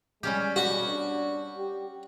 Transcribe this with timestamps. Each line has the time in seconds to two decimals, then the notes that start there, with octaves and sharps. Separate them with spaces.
0.23 G3 G#3 C#4 G4
0.56 B2 F#4
0.88 D4
1.58 G4